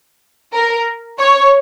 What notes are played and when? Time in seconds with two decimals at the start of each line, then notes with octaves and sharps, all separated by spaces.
0.53 A#4
1.18 C#5